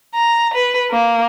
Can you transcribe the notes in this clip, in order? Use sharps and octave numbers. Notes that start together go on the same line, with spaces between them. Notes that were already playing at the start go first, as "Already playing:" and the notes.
A#5
B4
A#3